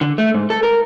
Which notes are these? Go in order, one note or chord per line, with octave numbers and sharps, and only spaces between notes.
D3
A3
G#2
A4
A#4